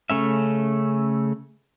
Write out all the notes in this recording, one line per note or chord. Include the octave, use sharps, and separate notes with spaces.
C#3 A3 C#4 E5